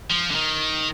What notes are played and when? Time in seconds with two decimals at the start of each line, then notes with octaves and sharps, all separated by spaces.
0.11 F3
0.31 D3
0.35 D#3